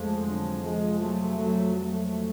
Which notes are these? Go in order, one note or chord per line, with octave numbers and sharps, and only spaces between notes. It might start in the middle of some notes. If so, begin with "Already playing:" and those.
Already playing: F2 F3 G#3 A3
D3 F#3
F3 G#3
F#3 A3
F#3 A3
F#3 A3